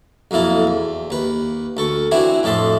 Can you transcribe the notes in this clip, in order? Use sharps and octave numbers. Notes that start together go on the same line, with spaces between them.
B1 F2 A#3 E4 A4
E2
D#2 B4
D2 A4 C#6
E3 C4 D4 E4 F#4
F2 A2 A4 E5 A5 C6